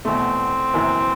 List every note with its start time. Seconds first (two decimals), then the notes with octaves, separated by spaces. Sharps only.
0.05 E2 B2 A3 C4
0.74 F#1 F#2 E3